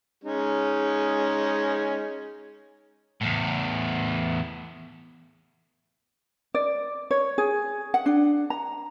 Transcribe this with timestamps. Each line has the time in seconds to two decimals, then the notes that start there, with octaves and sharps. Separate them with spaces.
0.24 G#3 C#4 D#4
3.21 E2 A2
6.55 D5
7.11 C#5
7.38 G#4
7.94 F#5
8.06 D4
8.50 A#5